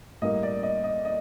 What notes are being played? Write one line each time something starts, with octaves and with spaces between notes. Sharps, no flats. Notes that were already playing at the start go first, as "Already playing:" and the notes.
A2 G3 A#3 D#5
D5
D#5
D#5
D#5